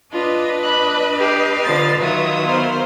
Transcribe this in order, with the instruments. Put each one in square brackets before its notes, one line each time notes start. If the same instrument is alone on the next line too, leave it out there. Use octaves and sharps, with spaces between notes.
[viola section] D4 [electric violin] F4 [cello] B4 D#5
[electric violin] B5 F#6
[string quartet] G4 [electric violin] F6 C7
[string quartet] D3 F3 A6
[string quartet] D#3 F#3 F4 [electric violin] E5 D#6
[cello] B3 [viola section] A#4 C5 B5